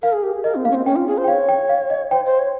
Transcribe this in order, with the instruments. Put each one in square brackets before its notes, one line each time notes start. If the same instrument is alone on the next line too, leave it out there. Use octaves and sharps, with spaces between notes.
[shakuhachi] A#4 [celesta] F5
[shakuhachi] G#4
G4
G#4
[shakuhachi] A#4 [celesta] D#5
[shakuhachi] C4
[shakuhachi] A#3 [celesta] F5
[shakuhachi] C#4
C4
[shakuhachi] C#4 [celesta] G5
[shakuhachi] F4
G#4
C5
[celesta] G5
[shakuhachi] C#5 [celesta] F5
[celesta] G5
F5
D#5
[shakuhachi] C5 [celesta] G5
[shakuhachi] C5
C#5